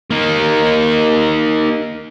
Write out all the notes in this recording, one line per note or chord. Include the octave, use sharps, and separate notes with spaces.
A#3 D#4